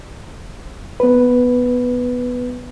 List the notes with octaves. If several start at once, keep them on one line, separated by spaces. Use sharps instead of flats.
B3 B4